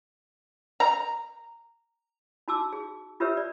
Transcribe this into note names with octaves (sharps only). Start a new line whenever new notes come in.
A#5
D#4 F#4 A5 D6 E6
G#4
F4 G4 A#4 B4 C#5 E5
D5